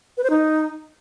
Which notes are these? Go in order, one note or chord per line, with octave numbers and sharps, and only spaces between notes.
B4
C5
D#4